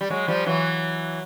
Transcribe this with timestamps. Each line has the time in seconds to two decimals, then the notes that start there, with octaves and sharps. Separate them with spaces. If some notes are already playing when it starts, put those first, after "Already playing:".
0.01 G3
0.10 F#3 G#3
0.28 F3 G3
0.46 E3 F#3